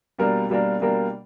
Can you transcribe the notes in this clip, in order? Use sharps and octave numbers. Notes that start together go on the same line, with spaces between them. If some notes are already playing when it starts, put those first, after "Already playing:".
B2 G3 A#3 D4 A#4
B2 G3 A#3 D4 A#4
B2 G3 A#3 D4 A#4